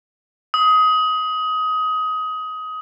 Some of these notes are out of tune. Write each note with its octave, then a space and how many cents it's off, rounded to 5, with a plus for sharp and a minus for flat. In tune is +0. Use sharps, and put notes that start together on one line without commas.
D#6 +20